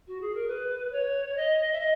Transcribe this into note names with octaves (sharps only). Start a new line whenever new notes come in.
F#4
G#4
A#4
B4
C#5
D#5
E5
D#5